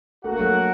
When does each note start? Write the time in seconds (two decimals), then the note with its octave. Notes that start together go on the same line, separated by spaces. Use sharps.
0.24 A3 F#4 A#4 F#5
0.32 A#3
0.39 F#3 A3